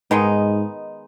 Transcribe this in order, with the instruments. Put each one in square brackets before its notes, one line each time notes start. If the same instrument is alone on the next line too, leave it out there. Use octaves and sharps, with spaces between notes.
[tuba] G#2 [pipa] D#3 G#3 B3 D#4